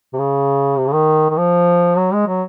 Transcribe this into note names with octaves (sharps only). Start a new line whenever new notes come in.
C3
C#3
C3
C#3
D#3
D#3
F3
F#3
G#3
F#3